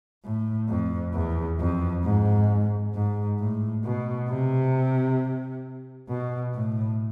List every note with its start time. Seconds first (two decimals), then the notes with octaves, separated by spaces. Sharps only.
0.24 A2
0.69 F2
1.13 E2
1.59 F2
2.03 G#2
2.94 G#2
3.39 A2
3.84 B2
4.29 C3
6.09 B2
6.53 A2